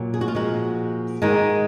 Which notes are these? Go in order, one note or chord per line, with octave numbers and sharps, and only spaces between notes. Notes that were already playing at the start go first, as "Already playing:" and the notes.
Already playing: A#2 F#3
G#4
F#4
F4
A#2 F3 G#3 F#4
G#2 D#3 G#3